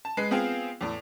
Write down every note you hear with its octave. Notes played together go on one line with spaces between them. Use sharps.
A5
G#3 B4 C7
B3 C4 F4 G#4 F5 G5
E2 A2